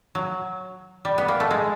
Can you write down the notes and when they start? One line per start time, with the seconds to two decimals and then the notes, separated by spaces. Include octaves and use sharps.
0.15 F#3
1.05 G3
1.18 B3
1.28 A#3
1.40 A3
1.51 G#3